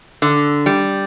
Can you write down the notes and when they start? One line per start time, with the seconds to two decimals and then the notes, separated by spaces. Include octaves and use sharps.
0.22 D3
0.66 G3